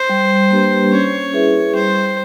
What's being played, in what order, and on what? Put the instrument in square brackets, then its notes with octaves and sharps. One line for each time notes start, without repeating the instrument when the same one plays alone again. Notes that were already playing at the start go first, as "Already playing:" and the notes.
Already playing: [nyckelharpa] C5
[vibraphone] G3
A#3 D4 G4 B4
[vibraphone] C#4 [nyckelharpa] C#5
[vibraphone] E4 G#4 B4 E5
[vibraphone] G3 [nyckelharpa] C5